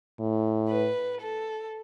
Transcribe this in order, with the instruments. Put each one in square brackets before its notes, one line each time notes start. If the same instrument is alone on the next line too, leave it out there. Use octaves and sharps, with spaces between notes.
[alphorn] A2
[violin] B4
A4